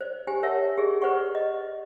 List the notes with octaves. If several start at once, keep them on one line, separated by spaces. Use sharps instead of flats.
C5 D5
G4 C5 G#5
A#4 C#5 E5 F#5 A5
G4 G#4 D5
B4 C5 D5 F#5 C#6
D#5